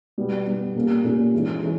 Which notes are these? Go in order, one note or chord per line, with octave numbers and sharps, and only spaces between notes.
B2 G3 B3
B2 G3 B3
A#2 A#3 C#4 G4
A#2 A#3 C#4 G4
G#2 E3 G#3 C#4
E3 G#3 C#4